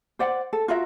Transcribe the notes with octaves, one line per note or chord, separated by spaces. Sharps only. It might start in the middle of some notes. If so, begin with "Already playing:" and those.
C5 D5 F#5
A4
F4 F#4 A#4 E5